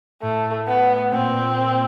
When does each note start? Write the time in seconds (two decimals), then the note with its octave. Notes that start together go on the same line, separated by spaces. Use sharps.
0.22 A2 A3
0.68 B3
1.12 A#2 C4